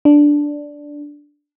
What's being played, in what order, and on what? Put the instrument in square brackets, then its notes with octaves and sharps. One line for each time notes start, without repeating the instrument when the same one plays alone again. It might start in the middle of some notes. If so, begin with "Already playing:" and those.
[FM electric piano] D4